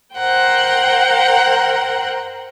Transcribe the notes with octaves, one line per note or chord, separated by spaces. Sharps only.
A#4 C5 F#5 G5